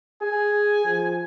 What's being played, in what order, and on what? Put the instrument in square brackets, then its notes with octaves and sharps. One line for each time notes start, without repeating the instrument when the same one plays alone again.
[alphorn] G#4 [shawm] G#5
[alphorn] F3